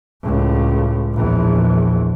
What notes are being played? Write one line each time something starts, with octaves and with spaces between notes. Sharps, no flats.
C#2 A2
A#1 E2